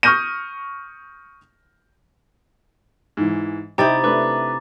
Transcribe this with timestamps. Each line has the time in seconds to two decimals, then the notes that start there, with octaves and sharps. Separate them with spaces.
0.03 C#6 D#6 F6 G6 A#6 D#7
3.17 G#2 E3
3.78 C3 D#4 E4 G5 A#5 D6 A6
4.04 A3 D4 B4 D6